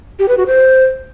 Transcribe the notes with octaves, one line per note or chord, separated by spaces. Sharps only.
G4
B4
F#4
C5